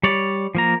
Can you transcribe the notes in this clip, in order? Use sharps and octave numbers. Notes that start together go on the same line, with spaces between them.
G3 C#5 D5
F3 A#3 A#5